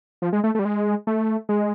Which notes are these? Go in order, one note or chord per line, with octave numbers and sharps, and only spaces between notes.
F3
G#3
A3
A3
G3
G#3
A3
G#3